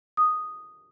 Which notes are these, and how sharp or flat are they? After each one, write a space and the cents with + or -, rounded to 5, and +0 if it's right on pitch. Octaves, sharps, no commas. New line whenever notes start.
D#6 -5